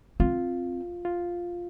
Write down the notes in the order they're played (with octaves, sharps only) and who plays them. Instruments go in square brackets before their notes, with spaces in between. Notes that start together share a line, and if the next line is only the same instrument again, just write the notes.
[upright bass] C4 [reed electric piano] F4
[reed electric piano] F4